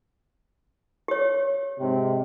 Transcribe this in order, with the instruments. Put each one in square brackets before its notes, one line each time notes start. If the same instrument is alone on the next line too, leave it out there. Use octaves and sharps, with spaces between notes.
[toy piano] G4 C#5
[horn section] G#2 C3